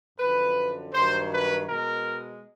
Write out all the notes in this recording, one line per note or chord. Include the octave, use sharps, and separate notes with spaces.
F#2 D3 F3 B4
G2 D#3 F#3 C5
B4
B2 G#3 A#4